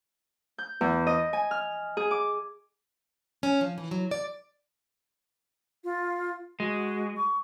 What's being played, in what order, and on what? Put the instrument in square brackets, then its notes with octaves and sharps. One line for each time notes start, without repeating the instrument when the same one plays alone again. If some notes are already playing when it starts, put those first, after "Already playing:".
[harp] G6
E2
D#5
G#5
F6
G#4
D6
[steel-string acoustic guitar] C#4
F3
E3
F#3
D5
[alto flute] F4
[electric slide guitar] G#3 [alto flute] F#4
[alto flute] C#6